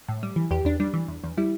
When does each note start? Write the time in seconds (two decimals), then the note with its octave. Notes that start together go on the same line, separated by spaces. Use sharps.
0.09 A2
0.23 G3
0.36 E3
0.51 E2 G4
0.65 E2 D4
0.80 G3 D4
0.94 E3
1.08 E2
1.24 E2
1.38 G3 E4